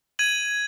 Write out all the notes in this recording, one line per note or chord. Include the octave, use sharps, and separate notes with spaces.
G#6 D#7 F#7